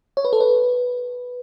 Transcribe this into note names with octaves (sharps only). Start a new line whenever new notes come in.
C#5
B4
A4
B4